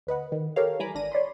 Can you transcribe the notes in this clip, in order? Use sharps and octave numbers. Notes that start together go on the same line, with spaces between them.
D2 B4 D#5 F#5
D#3
G4 A4 A#4 C#5 F5
E3 G3 G#5 A#5 B5 D6
G#1 D4 A#6 D#7
C#5 D5 B5 C6